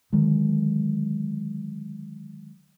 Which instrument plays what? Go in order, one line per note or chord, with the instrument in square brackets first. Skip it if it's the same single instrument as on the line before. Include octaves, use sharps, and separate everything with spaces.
[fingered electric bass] D3 D#3 F#3 G#3